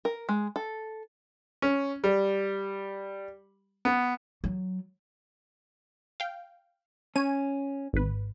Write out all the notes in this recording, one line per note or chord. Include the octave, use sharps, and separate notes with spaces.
A#4
G#3
A4
C#4
G3
B3
F#3
F5 G5
C#4 C#5 G#5 D#7
G#1 B4